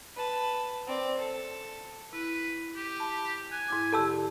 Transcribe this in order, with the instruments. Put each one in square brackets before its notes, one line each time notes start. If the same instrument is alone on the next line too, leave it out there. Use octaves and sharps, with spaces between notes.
[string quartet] B4 A5
C4 D5
A4
[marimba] E4 [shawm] B4
[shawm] G4
[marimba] A5 B5
[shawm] G#5 [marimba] F#6
[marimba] G#2 E4 D6
[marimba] D3 G4 [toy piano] A4 A5 E6